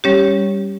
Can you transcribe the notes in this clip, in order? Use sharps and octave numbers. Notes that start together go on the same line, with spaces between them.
G3 C#4 G4 C#5